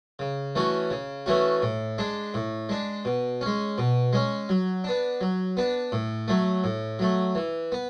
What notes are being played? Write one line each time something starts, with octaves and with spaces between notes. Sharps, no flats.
C#3
E3 A3 C#4 F#4
C#3
E3 A3 C#4 F#4
A2
G#3 D4
A2
G#3 D4
B2
G#3 C#4
B2
G#3 C#4
F#3
B3 D4
F#3
B3 D4
A2
F#3 A3
A2
F#3 A3
E3
B3